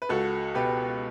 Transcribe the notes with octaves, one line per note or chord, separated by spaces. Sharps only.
B4
C#2 F#4 A4
B2 G4 B4